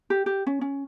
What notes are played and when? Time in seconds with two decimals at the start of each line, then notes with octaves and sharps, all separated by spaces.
0.10 G4
0.26 G4
0.47 C#4
0.61 C#4